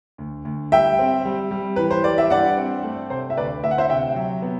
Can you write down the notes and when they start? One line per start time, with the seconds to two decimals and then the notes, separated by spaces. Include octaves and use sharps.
0.18 D2
0.45 D2
0.72 G3 E5 G5
0.99 C4
1.25 G3
1.51 G3
1.76 E3 B4
1.91 C5
2.04 G3 D5
2.18 E5
2.30 G2 D5 F#5
2.57 C4
2.83 A3
3.10 C3 C5
3.30 E5
3.37 D2 B4 D5
3.64 D2 E5
3.71 F#5
3.78 C5 E5
3.90 C3 E5 G5
4.16 F#3
4.42 B3